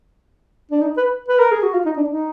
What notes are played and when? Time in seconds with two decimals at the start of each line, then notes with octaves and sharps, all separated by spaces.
0.71 D4
0.81 D#4
0.97 B4
1.28 B4
1.39 A#4
1.52 G#4
1.63 F#4
1.74 F4
1.85 D#4
1.97 D4
2.09 D#4